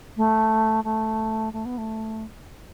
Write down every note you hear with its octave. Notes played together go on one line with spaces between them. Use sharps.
A3
A3
A3
B3
A3